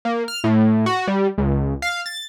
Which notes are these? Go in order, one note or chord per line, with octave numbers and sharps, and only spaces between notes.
A#3
F6
A2
F#4
G3
C#2
F5
A6